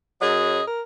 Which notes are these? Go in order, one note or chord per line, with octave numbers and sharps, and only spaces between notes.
F#2 F#3 G#4 D#5
A#4